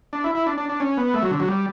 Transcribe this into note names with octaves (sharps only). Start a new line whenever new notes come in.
D4
E4
E4
D4
D4
D4
C#4
B3
A3
F#3
D3
F#3
G3